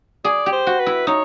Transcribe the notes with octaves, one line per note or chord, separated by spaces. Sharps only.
G#4 D5
G4
C5
F#4
B4
E4
D#4 C#5